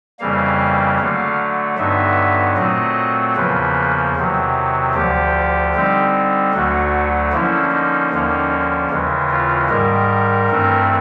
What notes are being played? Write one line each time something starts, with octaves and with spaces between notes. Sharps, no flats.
F2 C#3 E3 G3 A#3 F5
D3 F#3 A3
G2 D3 F#3 B3 D#4 E5
A#2 F#3 A3 C4 D#5
E2 C#3 F3 A#3 B4
E2 C3 D#3 F#3
D2 D3 F3 G4
D3 G3 C4 D#4
D2 D3 F#3 A3 F#4
D3 F3 A#3 C#4 E4
D#4
D#2 D3 F3 A#3 C#4
D#2 C#3 E3 G#3
F4
G#2 D#3 G3 A#4
G2 E3 A3 C4